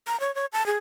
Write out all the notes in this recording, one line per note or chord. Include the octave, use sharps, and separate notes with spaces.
A#5
C#5
C#5
A5
G#4